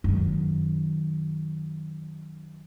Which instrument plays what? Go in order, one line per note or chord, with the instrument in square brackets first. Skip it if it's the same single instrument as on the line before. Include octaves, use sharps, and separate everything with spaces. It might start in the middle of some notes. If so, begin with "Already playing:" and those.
[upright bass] F#2 D#3